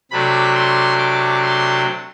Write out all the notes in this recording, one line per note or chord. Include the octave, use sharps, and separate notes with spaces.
C3 F#3 A3 D4 B5
C6
D6
C6